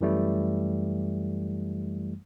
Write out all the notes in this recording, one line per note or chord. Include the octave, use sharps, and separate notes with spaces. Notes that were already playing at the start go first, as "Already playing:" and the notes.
F#2 E3 G3 A3